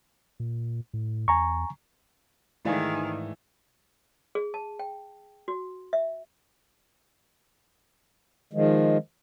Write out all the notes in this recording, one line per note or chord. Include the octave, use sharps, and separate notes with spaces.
A#2
A2
E2 G#5 A#5 C#6
G#2 D#3 E3 A3 D5 F5 G#5
G#4
A5
G5
F#4
E5
D#3 F3 G#3